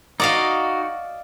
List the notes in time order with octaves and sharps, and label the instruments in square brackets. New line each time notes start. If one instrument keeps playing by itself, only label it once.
[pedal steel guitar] D#4 F#4 [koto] D5 D#5 F5